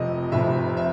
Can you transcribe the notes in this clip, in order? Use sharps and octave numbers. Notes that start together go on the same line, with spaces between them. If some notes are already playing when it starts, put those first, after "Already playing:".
Already playing: F1 F2 C3 F3 D#5
F1 F2 C3 F3 E5
E5